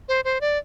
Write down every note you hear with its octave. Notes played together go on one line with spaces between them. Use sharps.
C5
C5
D5